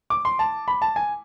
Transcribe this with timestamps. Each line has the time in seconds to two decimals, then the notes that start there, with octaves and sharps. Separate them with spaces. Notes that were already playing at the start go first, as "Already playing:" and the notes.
0.10 D6
0.25 C6
0.39 A5
0.68 B5
0.82 A5
0.96 G#5